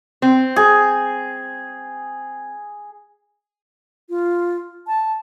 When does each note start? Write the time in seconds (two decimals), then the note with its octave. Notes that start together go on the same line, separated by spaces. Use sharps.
0.22 C4
0.56 G#4
4.09 F4
4.87 A5